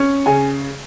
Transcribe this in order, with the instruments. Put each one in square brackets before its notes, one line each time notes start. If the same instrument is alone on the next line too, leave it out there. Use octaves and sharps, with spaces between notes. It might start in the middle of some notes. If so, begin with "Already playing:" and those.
Already playing: [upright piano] C#4
C#3 G#5